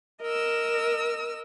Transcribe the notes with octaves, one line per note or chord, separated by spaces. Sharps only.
A#4 D#5 E6